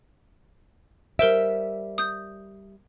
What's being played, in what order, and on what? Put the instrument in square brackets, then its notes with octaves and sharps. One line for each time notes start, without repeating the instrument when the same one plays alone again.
[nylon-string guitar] G3 E5 [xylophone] A#4 C5 D7
[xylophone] D#6 G6